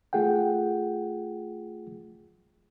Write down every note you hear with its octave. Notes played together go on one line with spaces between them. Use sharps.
A3 F4 G#4 F#5 G5